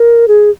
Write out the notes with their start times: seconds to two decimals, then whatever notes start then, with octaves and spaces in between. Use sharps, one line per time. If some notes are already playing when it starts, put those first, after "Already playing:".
Already playing: A#4
0.28 G#4